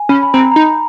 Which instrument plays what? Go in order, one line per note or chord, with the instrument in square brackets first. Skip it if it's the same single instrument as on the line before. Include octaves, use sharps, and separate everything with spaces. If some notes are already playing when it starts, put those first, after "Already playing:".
Already playing: [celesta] G#5
[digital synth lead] C#4 [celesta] B5
[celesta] B5
[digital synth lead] C4 [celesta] A#5
[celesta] A#5
[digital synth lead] D#4 [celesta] B5